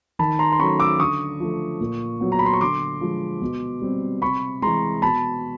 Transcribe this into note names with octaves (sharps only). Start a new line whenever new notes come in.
D#3 A5 B5
A#5 C6
C6
F#3 A3 C#4 B5 C#6
D6 E6
D3 C#6 D#6
F3 A3
A#2
F#3 B3
A#5
B5
C6
C#6
D3 C6 D6
F3 G#3
B2
G3 C4
C3 B5 C#6
E3 G#3 A#5 C6
B2 A5 B5